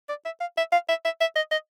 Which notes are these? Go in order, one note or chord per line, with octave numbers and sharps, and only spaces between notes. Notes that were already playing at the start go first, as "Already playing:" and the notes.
D5
E5
F5
E5
F5
E5
E5
E5
D#5
D#5